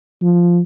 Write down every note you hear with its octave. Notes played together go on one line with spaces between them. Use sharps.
F3